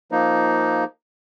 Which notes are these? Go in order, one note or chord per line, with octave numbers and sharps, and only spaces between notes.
F3 A#3 D#4